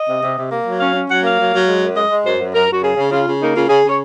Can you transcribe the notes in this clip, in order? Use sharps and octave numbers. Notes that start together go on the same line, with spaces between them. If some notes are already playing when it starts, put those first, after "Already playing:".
Already playing: D#5
C3
C3
C3
A#3
F#3
C#4 F5
C#4
F#3 F#5
A#3 F5
F#3
F#3
G#3
F#2
G#3 D#5
G#3
F#2 C5
F#2
F#2 A#4
F#2 F#4
C#3 G#4
C#3
C#3 F4
C#3
A#3 D#4
C#3 F4
C#3 G#4
C#3
C#5